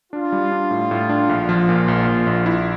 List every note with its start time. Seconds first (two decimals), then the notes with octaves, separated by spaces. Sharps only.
0.12 D4 F4
0.32 G3
0.52 D4
0.71 A2
0.91 A2
1.09 D4
1.29 A#1
1.49 F3
1.69 A#2
1.88 A#1
2.08 A#1
2.27 A#1
2.46 E4